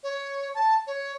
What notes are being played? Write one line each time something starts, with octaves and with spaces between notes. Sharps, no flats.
C#5
A5
C#5